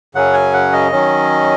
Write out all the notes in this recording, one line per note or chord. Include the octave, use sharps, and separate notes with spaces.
F#2 C#3 F#3 C#4 F#5
G#5
F#5
D#5
D#3 F#3 C#4